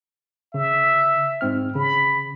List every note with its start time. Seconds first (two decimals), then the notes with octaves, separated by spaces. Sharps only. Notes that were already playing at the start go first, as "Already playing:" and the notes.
0.54 C#3 E5
1.41 G#2 C4 F6
1.75 C#3 B5